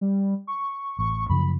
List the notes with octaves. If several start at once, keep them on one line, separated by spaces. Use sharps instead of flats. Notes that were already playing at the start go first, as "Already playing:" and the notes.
G3
C#6
A1 C#6
F#2 C#3 F3 B5